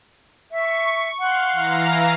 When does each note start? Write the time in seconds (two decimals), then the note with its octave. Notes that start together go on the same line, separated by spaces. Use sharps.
0.52 E5 C#6
1.20 F5 F#5 C6
1.52 E3 F5 A#5